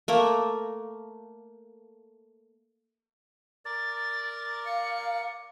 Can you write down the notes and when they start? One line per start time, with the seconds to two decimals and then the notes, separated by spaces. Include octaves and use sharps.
0.08 A3 A#3 A#4
3.65 A#4 D5 A6
4.66 F5 C#7